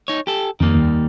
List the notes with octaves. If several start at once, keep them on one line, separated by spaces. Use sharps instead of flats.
D#4 C#5
G4 A4
F2 D#3 G3 A#3
D#2